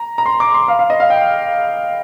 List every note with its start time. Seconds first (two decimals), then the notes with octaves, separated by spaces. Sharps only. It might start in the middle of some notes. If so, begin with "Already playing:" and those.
Already playing: A#5
0.18 A#5
0.26 C6
0.40 D6
0.54 C6
0.68 F5
0.79 F5
0.90 D#5
1.00 F5
1.10 G5